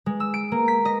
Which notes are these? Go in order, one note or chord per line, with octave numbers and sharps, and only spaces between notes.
G#3
E6
D7
A#3
B6
D#5